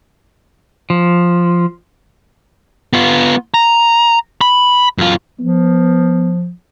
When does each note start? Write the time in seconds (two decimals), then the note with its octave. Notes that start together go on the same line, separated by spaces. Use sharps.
0.90 F3
2.93 B3 F4
3.54 A#5
4.41 B5
4.98 F#2 F4
5.40 F3 B3